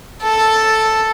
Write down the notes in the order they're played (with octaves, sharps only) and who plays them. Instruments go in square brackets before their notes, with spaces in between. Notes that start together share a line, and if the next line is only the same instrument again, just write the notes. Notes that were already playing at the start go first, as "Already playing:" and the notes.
[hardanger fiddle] A4